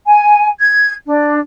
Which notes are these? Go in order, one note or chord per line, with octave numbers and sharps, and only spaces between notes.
G#5
G#6
D4